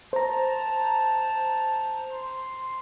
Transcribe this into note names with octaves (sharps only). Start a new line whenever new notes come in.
C5 A5 A#5
C6